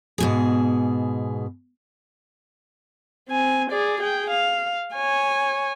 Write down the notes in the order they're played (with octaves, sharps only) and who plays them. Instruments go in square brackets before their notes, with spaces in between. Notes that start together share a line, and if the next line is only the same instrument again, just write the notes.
[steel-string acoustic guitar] G#2 B2 G#4
[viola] C4 G#5
G#4 D5
G#4 G5
F5
C#5 G#5